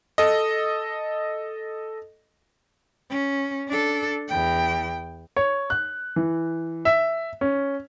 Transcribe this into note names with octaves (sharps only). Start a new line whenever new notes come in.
A4 D#5
C#4
D4 A4
E2 G5
C#5
F#6
E3
E5
C#4